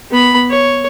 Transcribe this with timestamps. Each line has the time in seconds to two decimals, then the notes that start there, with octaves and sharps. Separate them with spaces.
0.11 B3 B5
0.50 C#5